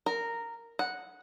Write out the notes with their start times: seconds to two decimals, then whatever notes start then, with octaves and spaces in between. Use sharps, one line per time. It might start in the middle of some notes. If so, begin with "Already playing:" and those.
0.06 A#4
0.79 F#5